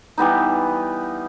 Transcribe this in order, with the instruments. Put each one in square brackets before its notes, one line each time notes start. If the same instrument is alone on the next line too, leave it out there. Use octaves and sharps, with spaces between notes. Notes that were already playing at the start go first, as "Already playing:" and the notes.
[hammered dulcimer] E3 G3 B3 D#4